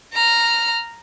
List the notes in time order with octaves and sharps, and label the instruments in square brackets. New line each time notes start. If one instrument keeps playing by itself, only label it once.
[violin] A#5 F6